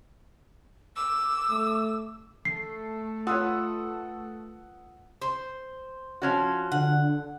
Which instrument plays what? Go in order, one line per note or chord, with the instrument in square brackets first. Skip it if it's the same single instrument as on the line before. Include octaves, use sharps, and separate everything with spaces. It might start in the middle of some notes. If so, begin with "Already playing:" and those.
[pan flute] D6 [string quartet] E6
[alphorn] A3
[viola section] A3 A4 [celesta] C7
[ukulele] F4 B4 C#5 [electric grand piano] F#5 D#6 E6
[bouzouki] C5
[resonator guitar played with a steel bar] F3 C#4 F#4
[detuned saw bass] D3 [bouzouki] F#5